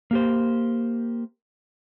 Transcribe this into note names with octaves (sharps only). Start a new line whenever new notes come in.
A#3 G4 C5